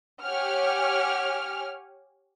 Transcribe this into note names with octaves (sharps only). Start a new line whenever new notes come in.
G4 C#5 F#5 G#5 F6